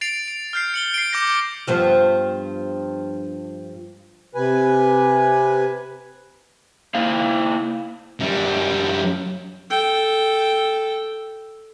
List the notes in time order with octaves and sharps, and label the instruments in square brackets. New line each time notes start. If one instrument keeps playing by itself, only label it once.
[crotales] A6 C7 D7 F7
D7
F6 G6 C7
C#7 F#7 G7
C7 D7
D6 G6 A#6
[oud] G2 F3 B3
[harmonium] C3 B4 G#5
[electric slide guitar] A#3 E4 C5 F5
[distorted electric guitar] F#2 G3
[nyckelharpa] A4 G5